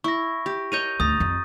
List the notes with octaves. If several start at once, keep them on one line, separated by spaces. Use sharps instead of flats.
E4 C#6 A#6
G4
A#4 C#5 D#5 G6 A#6 D#7
D2 A#5 D#6 A6
F2